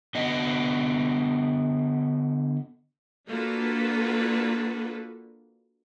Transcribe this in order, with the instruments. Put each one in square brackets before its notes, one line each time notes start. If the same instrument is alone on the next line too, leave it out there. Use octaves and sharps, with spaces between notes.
[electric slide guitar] D3 B3 F#4 D#5
[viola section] A#3 D4 F4 F#4 A4 B4